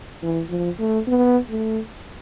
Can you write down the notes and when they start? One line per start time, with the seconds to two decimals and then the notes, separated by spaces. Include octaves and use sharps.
0.22 E3
0.50 F3
0.79 A3
1.08 B3
1.50 A3